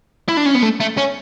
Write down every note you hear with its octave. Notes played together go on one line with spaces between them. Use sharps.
E4
D4
C#4
B3
A3
A3
C#4